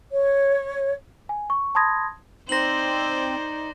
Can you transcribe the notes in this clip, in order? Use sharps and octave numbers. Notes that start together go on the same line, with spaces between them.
C#5
G#5
C#6
A5 B5 C6 D#6 G#6 A#6
C4 D#4 C5 D5 A#6 F#7